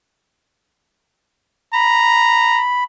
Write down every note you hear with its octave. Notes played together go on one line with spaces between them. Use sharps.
A#5 B5